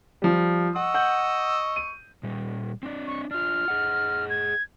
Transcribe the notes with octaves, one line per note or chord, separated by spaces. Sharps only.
F3 G3
D#5 F#5 C#6 E6
F#5 G6
D#7
A#2 G3
C4 D4 D5
C#6
D4 F4 F6
G#4 D#5 F#5
G#6